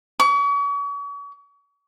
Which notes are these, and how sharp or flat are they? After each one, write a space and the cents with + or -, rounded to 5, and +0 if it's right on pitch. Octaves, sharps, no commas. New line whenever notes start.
C#6 +40